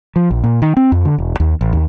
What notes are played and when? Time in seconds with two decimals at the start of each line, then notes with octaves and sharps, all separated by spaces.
0.16 F3
0.31 A#1
0.44 A#2
0.62 D#3
0.77 C4
0.92 F2
1.05 D3
1.18 E1
1.40 D#2
1.61 A1
1.73 D#2